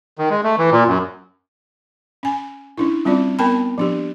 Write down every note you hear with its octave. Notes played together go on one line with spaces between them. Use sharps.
D#3
G#3
A3
E3
A#2
F#2
C#4 G#5
C#4 D4 E4
G3 C4 C#4 F4 D5
B3 A#4 G5 A5 B5
F3 D4 G4